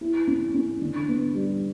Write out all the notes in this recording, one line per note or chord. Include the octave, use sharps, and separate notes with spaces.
E4
C#4
C#4
D3
B3
G3